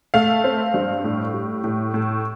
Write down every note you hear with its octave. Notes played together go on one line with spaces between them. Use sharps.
A3 F5
C4
G2
A2
G3
A2
A2